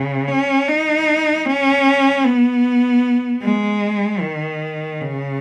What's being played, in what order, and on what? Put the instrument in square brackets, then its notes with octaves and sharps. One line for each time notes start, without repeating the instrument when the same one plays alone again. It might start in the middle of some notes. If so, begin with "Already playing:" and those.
Already playing: [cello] C#3
C#4
D#4
C#4
B3
G#3
D#3
C#3